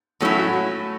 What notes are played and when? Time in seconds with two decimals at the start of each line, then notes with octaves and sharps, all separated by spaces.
0.20 A2 F#3 A3 C#4 E4
0.38 F#4